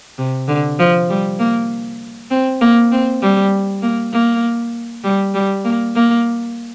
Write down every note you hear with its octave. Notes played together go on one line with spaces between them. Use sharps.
C3
D3
F3
G3
A#3
C4
A#3
C4
G3
A#3
A#3
G3
G3
A#3
A#3